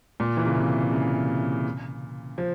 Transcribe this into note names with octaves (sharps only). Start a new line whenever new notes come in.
A#2
E3
C#3
C3
C#3
F3